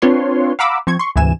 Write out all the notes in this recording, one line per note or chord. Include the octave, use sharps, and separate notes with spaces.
C4 D4 F4 B4 C#5 C6
F5 F#5 A#5 B5 D6 E6
F3 C4 C#6 G#6
C6 C#6
D2 G#2 C3 E3 G#5 E7